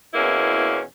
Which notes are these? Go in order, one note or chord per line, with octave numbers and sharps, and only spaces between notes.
E2 B2 A#3 C#4 E4